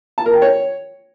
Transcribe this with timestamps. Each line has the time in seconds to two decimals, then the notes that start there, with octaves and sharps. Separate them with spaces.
0.18 A5
0.26 A#4
0.34 G5
0.42 C#5